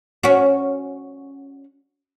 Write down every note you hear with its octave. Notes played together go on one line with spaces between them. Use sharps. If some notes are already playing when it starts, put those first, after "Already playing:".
C#4 F#4